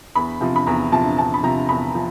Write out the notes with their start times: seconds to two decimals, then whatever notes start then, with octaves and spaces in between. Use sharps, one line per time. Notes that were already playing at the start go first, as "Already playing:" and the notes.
0.15 E2 B5
0.41 C3 F3
0.56 B5
0.67 E2 A#5
0.92 C3 F3 A5
1.18 E2 A5
1.34 B5
1.43 C3 F3 A#5
1.69 E2 B5
1.95 F3